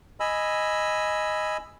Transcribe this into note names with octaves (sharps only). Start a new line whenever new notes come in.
D#5 G#5 B5 E6